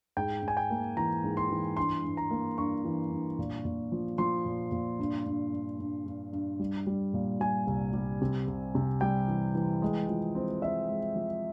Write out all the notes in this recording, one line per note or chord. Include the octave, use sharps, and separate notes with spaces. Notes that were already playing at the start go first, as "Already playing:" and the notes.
G#2 G5
G#2 G#5
G5
A#3
E3 A#5
G#2
C6
E3
G2 C6
G2
A#5
A#3
G2 C#6
E3
G2
A#2
A#2
F3
F3 C6
A#2
A#2
G2
G2
G2
G2
G2
G2
G3
G3
A#2
G3 G#5
C2
G3
C3
C2
C3
G3 G5
E3
E3
G#3
F3
C4
C4 E5
G#3
F3